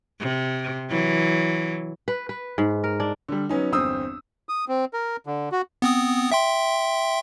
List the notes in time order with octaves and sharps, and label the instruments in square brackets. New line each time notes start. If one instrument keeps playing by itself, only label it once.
[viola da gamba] C3
E3 F#3
[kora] B4
B4
G#2
A#4
D4
[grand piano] D3 G3
F#3 B3 C#4 D#4
G1 E2 C4 D#6 E6
[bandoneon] D#6
C4
A#4
D3
F#4
[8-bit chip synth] B3 C4 D#6
E5 G5 C6